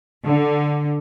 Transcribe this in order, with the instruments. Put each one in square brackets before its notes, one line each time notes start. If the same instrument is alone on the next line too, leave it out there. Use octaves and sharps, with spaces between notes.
[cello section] D3